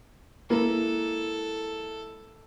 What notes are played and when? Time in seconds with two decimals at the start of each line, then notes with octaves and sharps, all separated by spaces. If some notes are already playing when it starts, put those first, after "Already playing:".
0.50 G#3 A#3 E4 A4 B4